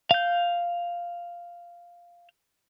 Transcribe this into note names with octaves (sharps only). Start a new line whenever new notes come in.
F5 G6